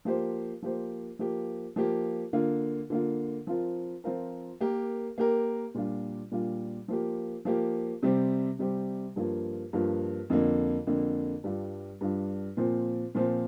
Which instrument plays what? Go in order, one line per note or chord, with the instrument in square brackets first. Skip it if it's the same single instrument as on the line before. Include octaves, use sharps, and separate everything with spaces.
[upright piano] F3 A#3 G4 C5
F3 A#3 G4 C5
F3 A#3 G4
F3 A#3 G4
D3 A#3 F4
D3 A#3 F4
F3 C4 F4 A#4
F3 C4 F4 A#4
A#3 G4 A#4
A#3 G4 A#4
A#2 G3 D4 F4
A#2 G3 D4 F4
F3 A#3 G4
F3 A#3 G4
C3 G3 C4 G4
C3 G3 C4 G4
G2 F3 A#3 F4
G2 F3 A#3 F4
F2 D3 A#3
F2 D3 A#3
G2 G3 D4 F4
G2 G3 D4 F4
A#2 F3 C4
A#2 F3 C4